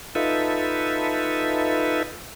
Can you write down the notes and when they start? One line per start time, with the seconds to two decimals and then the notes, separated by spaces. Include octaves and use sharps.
0.15 D#4 F4 A4 B4 E5